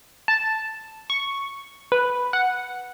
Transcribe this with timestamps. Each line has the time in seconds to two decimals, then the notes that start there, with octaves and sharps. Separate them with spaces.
0.28 A5
1.10 C#6
1.92 B4
2.33 F#5